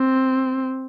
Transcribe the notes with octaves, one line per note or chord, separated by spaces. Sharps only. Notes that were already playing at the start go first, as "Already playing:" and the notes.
Already playing: C4